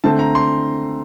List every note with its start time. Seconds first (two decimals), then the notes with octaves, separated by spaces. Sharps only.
0.04 D3 A3 C4 A5
0.19 A#5
0.35 C6